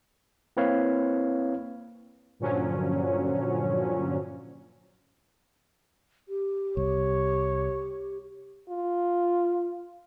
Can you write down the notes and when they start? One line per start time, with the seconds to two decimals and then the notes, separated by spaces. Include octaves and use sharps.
0.57 A#3 C4 E4 B4 C#5 F5
2.39 G2 A#2 D3 F3 F#3 C#4
6.29 G4
6.77 C2 C#5
8.69 F4